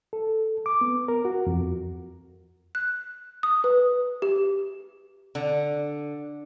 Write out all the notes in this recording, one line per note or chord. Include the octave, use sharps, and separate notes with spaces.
A4
D6
B3
A#4
F#4
F2
F#6
D#6
B4
G4
D3